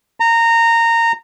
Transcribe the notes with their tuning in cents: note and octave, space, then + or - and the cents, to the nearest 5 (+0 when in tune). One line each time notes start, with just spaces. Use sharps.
A#5 -20